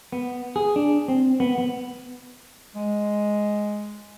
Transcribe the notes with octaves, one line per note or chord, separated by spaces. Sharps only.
B3
G#4
D4
C4
B3
B3
G#3